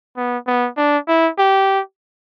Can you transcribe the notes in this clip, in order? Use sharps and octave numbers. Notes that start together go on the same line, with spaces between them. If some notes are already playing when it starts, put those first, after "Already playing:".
B3
B3
D4
E4
G4